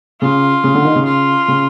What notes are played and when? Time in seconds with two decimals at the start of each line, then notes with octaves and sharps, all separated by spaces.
0.21 C#3 F4
0.64 C#3
0.75 D3
0.85 D#3
0.95 C#3
1.06 F4
1.48 C#3